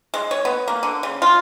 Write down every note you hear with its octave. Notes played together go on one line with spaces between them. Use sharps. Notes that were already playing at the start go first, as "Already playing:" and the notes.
G#3
C#5
B3
A#3
D3
C#3
F4